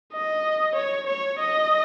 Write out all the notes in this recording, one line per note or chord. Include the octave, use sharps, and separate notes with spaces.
D#5
C#5
C#5
D#5